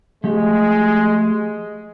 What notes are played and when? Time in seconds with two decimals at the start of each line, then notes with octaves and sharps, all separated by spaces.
0.24 F3 G#3 A3 G4